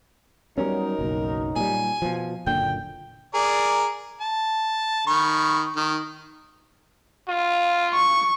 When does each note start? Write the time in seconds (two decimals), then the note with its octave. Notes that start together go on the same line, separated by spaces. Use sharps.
0.58 F#3 G3 B3 C#4 D#4 A#4
0.99 F#1 B1
1.56 A#2 G3 G#5
2.02 B2 F3
2.47 F#1 A#2 D3 G5
3.34 G#4 A#4 D5
4.21 A5
5.07 D#3 B5 C#6
5.76 D#3
7.28 F4
7.94 C#6